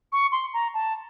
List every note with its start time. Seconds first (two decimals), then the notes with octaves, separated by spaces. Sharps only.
0.12 C#6
0.32 C6
0.54 A#5
0.74 A5